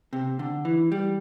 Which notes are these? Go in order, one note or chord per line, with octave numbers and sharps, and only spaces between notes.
C3
D3
E3
G3